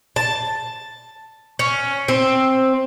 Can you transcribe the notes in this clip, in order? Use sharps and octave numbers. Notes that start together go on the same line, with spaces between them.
A5
C#4
C4